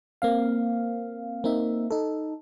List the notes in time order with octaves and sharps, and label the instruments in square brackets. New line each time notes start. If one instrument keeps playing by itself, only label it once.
[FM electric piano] A#3 C4 F5
A#3 C4 D#4 E5
D#4 A4